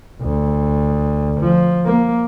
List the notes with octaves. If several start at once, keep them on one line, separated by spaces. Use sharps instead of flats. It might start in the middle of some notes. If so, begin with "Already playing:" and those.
D2
F3
A#3